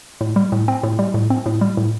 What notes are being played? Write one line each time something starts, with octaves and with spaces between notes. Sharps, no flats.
A2
G3
A2
C4
A2
G3
A2
C4
A2
G3
A2